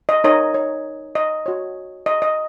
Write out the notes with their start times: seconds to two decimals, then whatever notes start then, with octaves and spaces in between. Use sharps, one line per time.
0.09 D#5
0.24 D#4 A#4 C#5 D#5
0.54 C#5
1.15 D#5
1.46 F#4 C#5
2.06 D#5
2.22 D#5